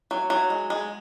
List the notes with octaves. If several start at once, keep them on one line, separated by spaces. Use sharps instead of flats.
F#3
F#3
G#3
G#3